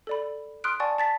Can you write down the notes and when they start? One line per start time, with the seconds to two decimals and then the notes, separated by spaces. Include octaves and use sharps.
0.07 A4 D5 B5
0.64 C6 D#6 F6 F#6 D7
0.80 D5 F#5 G#5 A5 C#6
0.98 A5 A6 B6